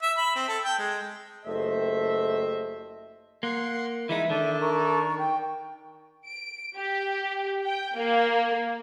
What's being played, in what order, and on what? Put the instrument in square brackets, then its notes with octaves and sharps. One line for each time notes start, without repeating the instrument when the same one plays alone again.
[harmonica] E5
B5
C4
A4
G5
G#3
[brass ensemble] F#1 A3 G4 C5 D#5 E5
[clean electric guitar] A#3 [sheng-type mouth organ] F#5 C6
[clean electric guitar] E3 G#3 D#4 [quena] E5 [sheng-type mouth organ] B5
[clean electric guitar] D#3 [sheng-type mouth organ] D4 A4
[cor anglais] A#4 [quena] C#6
[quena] G5
[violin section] D7
G4
G5
A#3